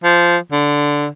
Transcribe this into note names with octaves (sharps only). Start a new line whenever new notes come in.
F3
D3